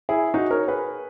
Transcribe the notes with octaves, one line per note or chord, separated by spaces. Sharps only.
E4 G#4
D#4 F#4
A#4 C#5
G#4 B4